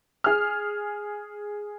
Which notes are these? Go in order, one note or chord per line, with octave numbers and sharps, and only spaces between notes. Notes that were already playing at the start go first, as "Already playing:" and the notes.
G#4 F6